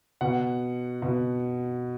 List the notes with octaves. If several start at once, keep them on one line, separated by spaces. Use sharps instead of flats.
B2 F#5
B2